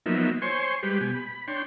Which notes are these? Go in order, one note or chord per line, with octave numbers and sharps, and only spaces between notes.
F3 F#3 A#3 B3 D#4 E5
C5 C#5 G#5 C6 C#6
G3 G#3 G4 B4
B2 G4 G#5
B5
D4 C#5 G5 C6